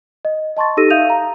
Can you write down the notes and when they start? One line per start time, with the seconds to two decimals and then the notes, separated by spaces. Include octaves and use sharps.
0.25 D#5
0.57 D#5 A5 C6 C#6 A6
0.77 D#4 G4 A4 E6 A#6 D#7
0.90 E5 F5 D#6 G6 D#7 F7
1.10 A#5